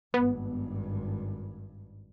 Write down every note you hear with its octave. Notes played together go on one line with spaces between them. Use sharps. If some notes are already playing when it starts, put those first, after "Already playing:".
G#1 G2 B3